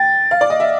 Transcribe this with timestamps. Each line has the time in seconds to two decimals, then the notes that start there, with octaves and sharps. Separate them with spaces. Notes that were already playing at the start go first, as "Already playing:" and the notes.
Already playing: G5 A6
0.31 F5
0.41 D5
0.50 D#5
0.60 E5